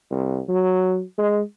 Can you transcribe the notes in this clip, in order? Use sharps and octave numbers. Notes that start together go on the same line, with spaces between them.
C2
F#3
G#3